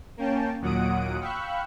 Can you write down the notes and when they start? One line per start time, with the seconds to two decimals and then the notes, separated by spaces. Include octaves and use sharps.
0.17 A#3 C#4 G5 A5
0.61 D#2 A#2 F#3 F#5 D#6 D7
1.20 F5 G5 B5 C#6 E6 F#6